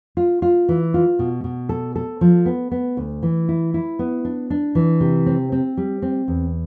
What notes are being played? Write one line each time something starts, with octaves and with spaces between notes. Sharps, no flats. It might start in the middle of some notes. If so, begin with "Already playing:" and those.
F4
F4
E3
F4
B2
B2
A4
A4
F3
B3
B3
D2
E3
E4
E4
B3
D4
D4
E3
C3
C4
C4
G3
C4
E2